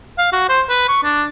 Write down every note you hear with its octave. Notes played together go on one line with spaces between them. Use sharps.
F5
F#4
C5
B4
C#6
D4